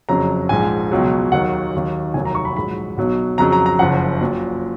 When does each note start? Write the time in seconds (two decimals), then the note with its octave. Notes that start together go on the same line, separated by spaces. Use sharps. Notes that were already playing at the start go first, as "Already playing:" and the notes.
0.09 F#1 F2 C#3 F#3 A#5
0.49 A#1 G#2 F3 G#5
0.92 C#2 B2 F#3
1.32 D#2 D#3 F#3 F#5
1.73 D#2 D#3 F#3
2.14 F1 D#2 D#3 F#3 G#5
2.25 A#5
2.35 C#6
2.45 B5
2.56 A#1 G#2 F#3 B5
2.97 B1 B2 F#3
3.38 F2 C#3 F#3 A#5
3.52 A#5
3.66 A#5
3.79 F#1 F#2 F3 F#5
4.20 A#1 A#2 F#3